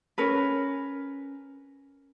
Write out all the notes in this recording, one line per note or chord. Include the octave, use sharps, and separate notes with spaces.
C#4 A#4 B4